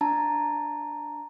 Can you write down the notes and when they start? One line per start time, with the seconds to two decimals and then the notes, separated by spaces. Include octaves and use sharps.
0.01 D4 A5 A#5